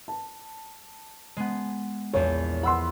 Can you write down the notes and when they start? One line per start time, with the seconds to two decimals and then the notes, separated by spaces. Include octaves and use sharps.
0.08 A5
1.37 G#3 B3
2.13 A#1 E2 C#5
2.63 F#5 B5 C6 E6